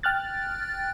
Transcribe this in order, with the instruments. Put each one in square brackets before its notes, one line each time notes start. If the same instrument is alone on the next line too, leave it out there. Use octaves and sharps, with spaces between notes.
[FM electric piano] G5 F6 F#6 A6